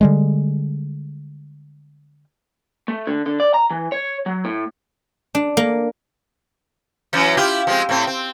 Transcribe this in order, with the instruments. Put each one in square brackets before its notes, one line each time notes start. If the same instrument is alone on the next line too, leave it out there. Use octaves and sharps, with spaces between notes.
[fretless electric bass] D3 G3 G#3
[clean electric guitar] A3
D3
D3
D5
A#5
E3
C#5
F#3
A2
[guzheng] D4
A#3
[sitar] E3 F#3 C#4
E4 F4 G4
F3 G#3 C4
A2 C4
C4